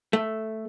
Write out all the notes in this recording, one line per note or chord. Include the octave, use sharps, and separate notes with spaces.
A3